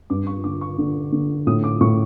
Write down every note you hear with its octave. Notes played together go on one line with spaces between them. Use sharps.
G2 D6
C#6
D3 D6
C#6
D3
D3
A2 D#6
D6
A2 C#6